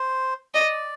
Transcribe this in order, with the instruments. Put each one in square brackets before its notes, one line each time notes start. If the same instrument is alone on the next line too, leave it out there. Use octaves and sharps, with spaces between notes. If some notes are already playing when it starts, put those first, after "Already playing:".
Already playing: [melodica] C5
[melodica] D5 [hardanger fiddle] D#5